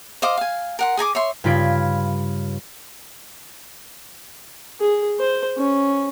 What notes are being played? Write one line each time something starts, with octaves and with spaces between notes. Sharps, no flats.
C5 D#5 F5 D6
F5 G#5
A#4 F#5 C6
G#4 G#5 A#5 D6
C#5 E5 C6
G2 C#3 F4 B5 G#6 D7
G#4
C5
C#4